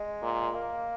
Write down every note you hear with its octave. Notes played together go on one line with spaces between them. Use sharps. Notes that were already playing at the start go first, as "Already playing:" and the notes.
Already playing: G#3
A#2
A#3